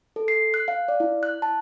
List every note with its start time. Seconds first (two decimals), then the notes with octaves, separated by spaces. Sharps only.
0.16 A4
0.28 C7
0.54 F#6
0.68 F5
0.88 D5
1.00 E4
1.23 F#6
1.42 A5